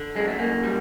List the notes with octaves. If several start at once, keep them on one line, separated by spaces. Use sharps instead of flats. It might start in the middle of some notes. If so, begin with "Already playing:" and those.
Already playing: D3
F#2 G#3
A3
F#2 A#3
G3